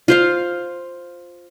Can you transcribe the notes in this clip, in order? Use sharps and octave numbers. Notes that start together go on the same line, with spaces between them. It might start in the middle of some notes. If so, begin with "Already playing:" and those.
F4 C5 F5